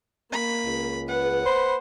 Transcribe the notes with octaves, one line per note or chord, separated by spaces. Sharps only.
A#3 B5
C#2
B4 F#5
C5 B5